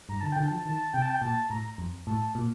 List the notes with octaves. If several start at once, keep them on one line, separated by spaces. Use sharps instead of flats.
G2 A#5
D3 A5
D3 G5
A5
F3
D#3 A5
C3 G5
A5
G5
A#2 A5
A2 A#5
F2
A2 A5
A#2